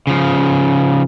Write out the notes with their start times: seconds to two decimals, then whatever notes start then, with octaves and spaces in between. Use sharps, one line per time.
0.07 C#3 F3